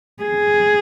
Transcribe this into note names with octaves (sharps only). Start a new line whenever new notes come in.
G#4